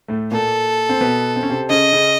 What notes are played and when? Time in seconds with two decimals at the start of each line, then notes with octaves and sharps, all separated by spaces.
0.08 A2 A3
0.32 A#2 A#3 A4
0.89 C4
1.01 B2 B3
1.36 C4
1.43 C#4
1.50 C3 C4
1.70 C#3 C#4 D#5
1.93 C#3 C#4